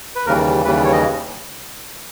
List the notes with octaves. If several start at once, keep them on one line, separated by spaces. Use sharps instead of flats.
B4
D#2 C#3 E3 G3 A#4
D#2 C#3 E3 G3 B4
C#5
D#5